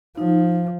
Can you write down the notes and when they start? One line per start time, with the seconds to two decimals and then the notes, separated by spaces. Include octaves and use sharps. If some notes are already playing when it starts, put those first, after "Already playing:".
0.17 F3 D#4